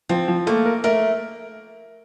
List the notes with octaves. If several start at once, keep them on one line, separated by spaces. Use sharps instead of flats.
F3 C4
F3
A3 A#3
A#4
A3 A#4